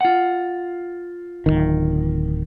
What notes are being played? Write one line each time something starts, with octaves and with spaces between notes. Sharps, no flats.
F4 F#5
D1 C2 D#3